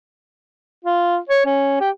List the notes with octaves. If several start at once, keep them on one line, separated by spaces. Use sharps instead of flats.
F4
C#5
C#4
G4